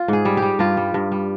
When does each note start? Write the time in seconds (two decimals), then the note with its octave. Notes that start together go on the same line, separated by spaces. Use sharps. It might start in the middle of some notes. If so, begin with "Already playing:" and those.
Already playing: F4
0.08 G#2 G#4
0.25 G3
0.37 G4
0.42 G3
0.59 G2 F4
0.77 G3
0.94 G2
1.12 G3